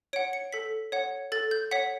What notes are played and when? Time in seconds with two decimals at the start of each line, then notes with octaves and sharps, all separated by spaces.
0.13 C#5 F#5 D7
0.33 C#7
0.52 A4 B6
0.92 C#5 F#5
1.32 A4 A6
1.51 G6
1.71 C#5 F#5 B6